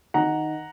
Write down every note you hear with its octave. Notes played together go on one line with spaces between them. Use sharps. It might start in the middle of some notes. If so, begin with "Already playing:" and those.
D#3 F#5 A#5